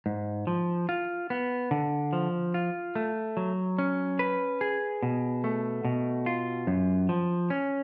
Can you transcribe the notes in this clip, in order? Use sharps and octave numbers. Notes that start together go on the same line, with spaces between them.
G#2
F3
F4
B3
D3
F3
F4
A3
F#3
C#4
B4
G#4
B2
A3
B2
F4
F#2
F3
C#4